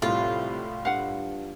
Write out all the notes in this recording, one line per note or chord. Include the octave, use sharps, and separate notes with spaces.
C2 A2 C3 F4
G2 F5 F#5